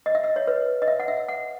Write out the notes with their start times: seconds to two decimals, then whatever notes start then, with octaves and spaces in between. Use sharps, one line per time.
0.06 D#5
0.15 E5
0.24 D#5
0.36 C#5
0.47 B4
0.82 D#5
0.88 E5
1.00 F#5
1.08 E5
1.29 F#5